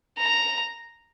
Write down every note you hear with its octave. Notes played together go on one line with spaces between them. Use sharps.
A#5